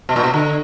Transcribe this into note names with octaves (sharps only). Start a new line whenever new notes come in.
B2
A#2
B2
D3